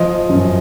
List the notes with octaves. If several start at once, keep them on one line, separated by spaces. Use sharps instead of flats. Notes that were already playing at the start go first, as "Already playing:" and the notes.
Already playing: F3 D#5
F#2